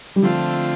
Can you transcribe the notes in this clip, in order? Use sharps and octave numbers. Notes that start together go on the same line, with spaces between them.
G3
D3 F3 A3 C4 F4